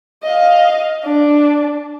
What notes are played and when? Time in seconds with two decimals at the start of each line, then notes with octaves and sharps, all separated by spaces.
0.23 D#5 F5
1.04 D4